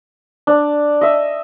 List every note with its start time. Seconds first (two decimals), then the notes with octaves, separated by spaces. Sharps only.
0.47 D4
1.01 D#5 E5